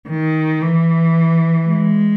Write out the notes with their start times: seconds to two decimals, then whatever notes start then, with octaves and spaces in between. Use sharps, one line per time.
0.09 D#3
0.62 E3
1.68 G#3